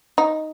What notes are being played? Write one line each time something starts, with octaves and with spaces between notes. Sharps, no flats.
D#4